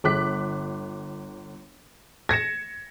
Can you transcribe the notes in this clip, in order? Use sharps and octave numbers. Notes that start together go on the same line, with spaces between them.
G1 D6 F#6 B6
G#6 A#6 C#7 E7